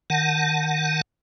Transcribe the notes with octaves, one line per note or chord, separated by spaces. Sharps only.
D#3 F#5 A5